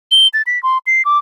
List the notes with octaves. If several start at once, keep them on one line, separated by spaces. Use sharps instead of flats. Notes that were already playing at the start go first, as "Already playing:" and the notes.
G7
A6
B6
C6
C7
D6